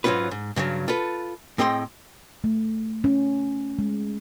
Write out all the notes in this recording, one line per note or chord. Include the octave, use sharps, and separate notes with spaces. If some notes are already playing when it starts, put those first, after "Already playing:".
G#2 F#3 B3 C#4 F4 B4
G#2
G2 C#3 F3 F#3
F4 A4 B4
A2 C4 G#4 D#5 G5 C6
A3
C#4
G#3